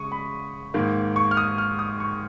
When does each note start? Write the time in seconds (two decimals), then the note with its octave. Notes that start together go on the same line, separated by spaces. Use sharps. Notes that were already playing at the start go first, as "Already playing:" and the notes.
Already playing: C#3 G#3 C#6 D#6
0.12 B5
0.74 G#2 D#3 A#3
1.16 C#6
1.31 F6
1.37 D#6
1.58 F6
1.79 D#6
2.00 C#6